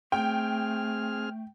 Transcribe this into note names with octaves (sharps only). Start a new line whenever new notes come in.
A3 C4 G#4 G5 F6